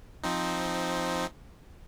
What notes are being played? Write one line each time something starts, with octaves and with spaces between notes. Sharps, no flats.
F3 C4 D#4